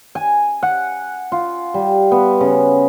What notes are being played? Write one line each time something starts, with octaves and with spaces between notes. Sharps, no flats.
G#5
F#5
F4
G3
B3
C#3